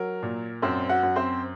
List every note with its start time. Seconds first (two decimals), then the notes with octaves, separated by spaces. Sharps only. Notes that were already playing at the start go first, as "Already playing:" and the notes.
Already playing: F#3 A#4
0.22 A#2
0.62 F#2 C4 C5
0.89 F#4 F#5
1.03 F#2
1.16 C4 C5